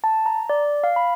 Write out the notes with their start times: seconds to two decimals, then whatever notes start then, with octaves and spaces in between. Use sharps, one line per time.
0.04 A5
0.26 A#5
0.49 D5
0.84 F5
0.96 B5